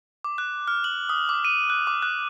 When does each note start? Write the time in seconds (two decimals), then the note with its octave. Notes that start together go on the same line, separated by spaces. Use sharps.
0.24 D6
0.38 F#6
0.68 F6
0.84 F#7
1.09 D#6
1.29 D6
1.45 D#7
1.70 F#6
1.87 D6
2.02 F#6